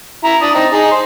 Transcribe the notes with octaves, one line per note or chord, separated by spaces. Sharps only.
E4 A#5
D4 D#6
C4 D#4
D#4 G#4
C5